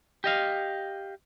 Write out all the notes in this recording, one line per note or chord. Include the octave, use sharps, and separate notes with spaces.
G4 D#5 F5